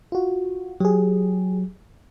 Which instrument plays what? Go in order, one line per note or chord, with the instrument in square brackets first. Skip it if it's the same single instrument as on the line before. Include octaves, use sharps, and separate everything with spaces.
[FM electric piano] F4 F#4
[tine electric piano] F#3 [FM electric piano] G4 G#4